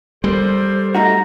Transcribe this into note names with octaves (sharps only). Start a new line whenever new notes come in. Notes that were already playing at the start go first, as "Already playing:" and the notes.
G3 A4 A#4 C5
A3 D#4 F#4 A#5